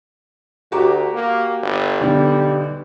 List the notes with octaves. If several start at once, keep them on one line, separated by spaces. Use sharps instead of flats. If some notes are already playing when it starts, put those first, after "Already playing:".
D2 F#4 G4 A#5
A#3
G1
B1 D3 G3